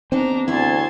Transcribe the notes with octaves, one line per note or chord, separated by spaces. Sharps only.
B3 C4 D4 D#4 G#4 A#5
D2 E4 G#4 C#5 A5 C6 G#6